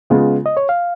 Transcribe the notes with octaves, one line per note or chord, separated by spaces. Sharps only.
C#3 G#3 B3 F4
D#5
C#5
F5